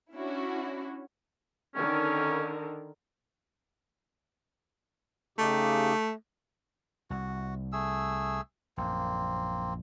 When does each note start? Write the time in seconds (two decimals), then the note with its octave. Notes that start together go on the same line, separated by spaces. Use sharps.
0.13 C#4 D4 E4 F#4
1.75 D3 D#3 C#4 A#4
5.38 C#3 A3 D#4 G4
7.10 C2 F#4
7.73 A3 G#4 E6
8.77 A#1 F#2 A#3 C4